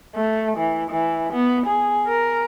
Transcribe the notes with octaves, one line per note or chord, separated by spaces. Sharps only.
A3
E3
E3
B3
G#4
A#4